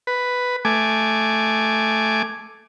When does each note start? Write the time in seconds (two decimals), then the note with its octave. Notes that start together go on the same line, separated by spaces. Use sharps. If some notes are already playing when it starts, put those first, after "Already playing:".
0.07 B4
0.65 A3 G#5 D6